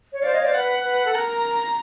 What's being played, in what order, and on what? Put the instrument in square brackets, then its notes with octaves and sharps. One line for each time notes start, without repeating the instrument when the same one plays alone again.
[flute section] C#5
[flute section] C5 D5 [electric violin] F5
[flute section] C#5 D#5
C5 D5
[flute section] B4 [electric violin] F#5
[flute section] B4
A4
[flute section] A#4 [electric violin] A#5